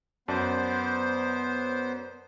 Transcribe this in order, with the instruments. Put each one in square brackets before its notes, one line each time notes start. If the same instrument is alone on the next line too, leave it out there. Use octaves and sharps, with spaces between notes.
[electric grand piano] F#2 D5 A5 [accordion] B3 C5